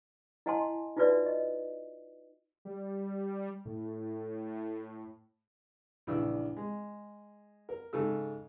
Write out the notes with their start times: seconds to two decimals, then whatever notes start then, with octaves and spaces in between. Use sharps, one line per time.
0.46 E4 D#5 F#5 G#5 A5 C6
0.97 D#4 F4 F#4 B4 D5 E5
1.26 D#5
2.65 G3
3.65 A2
6.07 A#1 C#3 E3 D4 E6
6.57 G#3
7.69 A#4
7.93 G#2 C#3 A4 E6